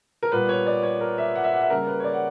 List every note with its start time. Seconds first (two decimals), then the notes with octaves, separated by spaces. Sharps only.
0.23 A#4
0.32 A#2 G3 B3 B4
0.49 C#5
0.67 D5
0.83 C#5
1.01 A#4
1.18 E5
1.35 F#5
1.44 E5
1.53 F#5
1.61 E5
1.70 C#3 G3 A#3 A#4
1.87 B4
2.00 C#5
2.04 D5
2.13 F#5